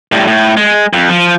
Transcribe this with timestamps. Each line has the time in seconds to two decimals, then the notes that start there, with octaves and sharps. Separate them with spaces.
0.12 A2 G3
0.27 A2
0.57 G#3
0.93 F2
1.09 F3